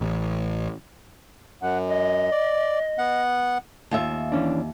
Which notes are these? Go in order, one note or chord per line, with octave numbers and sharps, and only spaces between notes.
A1
F#2 F#5
D#5
D5
B3 F#5
D#2 F4 E5
E3 C#4 D4